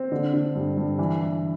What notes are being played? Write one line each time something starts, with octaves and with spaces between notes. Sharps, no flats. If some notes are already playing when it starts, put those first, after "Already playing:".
Already playing: C4
D3
D3
G2
G2
E3
E3